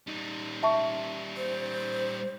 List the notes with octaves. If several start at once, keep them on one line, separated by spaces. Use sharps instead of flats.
G3 D#4
E5 A5 C#6
C5